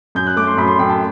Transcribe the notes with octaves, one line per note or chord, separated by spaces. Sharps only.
F#2 G6
F#6
A3 D6
C6
F#2 B5
C6
F#2 G5
A5